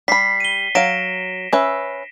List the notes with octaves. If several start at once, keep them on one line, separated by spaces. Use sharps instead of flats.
G3 B5 B6 C7
D#7 G7
F#3 F5 A#6 D7 E7
C#4 B4 E5